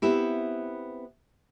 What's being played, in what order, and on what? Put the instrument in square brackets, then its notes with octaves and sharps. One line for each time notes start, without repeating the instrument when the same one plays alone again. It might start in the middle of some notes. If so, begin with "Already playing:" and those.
[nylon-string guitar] B3 C4 E4 G4